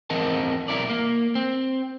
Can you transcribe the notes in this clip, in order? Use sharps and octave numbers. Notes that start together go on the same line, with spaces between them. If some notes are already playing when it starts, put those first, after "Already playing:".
E2 E3 C4 A#4 D#5 A5
B1 A#2 E4 A#4 D5
A#3
C4